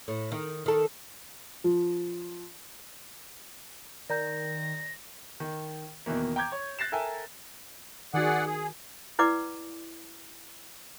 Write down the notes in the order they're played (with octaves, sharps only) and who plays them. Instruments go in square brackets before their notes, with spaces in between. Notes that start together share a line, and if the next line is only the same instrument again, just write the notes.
[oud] A2
D#3
D#3 A4
[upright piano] F3
[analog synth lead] D#3 [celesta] D5 A#5 G6 [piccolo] A#6
[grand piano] D#3
E2 B2 D#3 E3 A#3
G5 A#5 D6 G6 G#6
C#5
F#6 A6 A#6 C7 E7
A4 A#4 E5 G5 G#5
[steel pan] D#3 F#4 [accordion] G#4 D5 F#5
[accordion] G#4
[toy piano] E4 B4 D5 F#5 D6